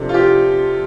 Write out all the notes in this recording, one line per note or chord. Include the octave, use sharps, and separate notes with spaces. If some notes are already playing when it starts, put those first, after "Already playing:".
Already playing: C3 F3 D4 A4
F4
G4